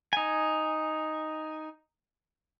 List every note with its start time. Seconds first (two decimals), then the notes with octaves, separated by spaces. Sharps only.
0.13 D#4 G#5